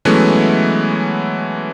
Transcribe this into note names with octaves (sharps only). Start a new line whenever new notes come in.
E3 F#3 G#3 A3 B3 C#4